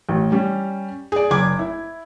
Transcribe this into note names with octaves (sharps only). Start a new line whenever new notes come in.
A1
G3 C#4
G#4 D5
F#1 D6 G#6
E4